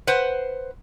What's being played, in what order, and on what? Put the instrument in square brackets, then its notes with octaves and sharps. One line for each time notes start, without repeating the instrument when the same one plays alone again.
[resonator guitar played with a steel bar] B4 C5 F#5